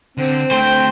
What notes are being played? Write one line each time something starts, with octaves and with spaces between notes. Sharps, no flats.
D3 C4
D3 A3 C5 G5